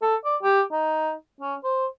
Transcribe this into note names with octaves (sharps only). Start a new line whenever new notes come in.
A4
D5
G4
D#4
C#4
C5